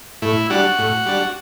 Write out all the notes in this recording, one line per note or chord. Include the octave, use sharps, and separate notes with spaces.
A2 E4
G3 D4 F#4
A2
G3 D4